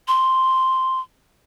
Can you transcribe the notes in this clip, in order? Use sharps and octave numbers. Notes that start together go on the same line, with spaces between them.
C6